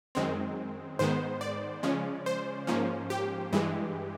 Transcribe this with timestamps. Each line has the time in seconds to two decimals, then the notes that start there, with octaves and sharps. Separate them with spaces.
0.15 F#2 D#3 G#3 C4
0.99 G#2 D#3 G#3 B3 C5
1.41 D5
1.83 C#3 F3 G#3 C#4
2.26 C5
2.67 G#2 F3 A#3 C#4
3.10 G4
3.52 G2 E3 G#3